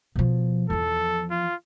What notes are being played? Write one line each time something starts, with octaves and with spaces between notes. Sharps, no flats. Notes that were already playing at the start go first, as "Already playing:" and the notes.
B2 F3
E2 F3 A4
F4